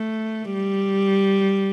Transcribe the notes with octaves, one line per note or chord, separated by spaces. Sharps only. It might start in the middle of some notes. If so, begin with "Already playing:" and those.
Already playing: A3
G3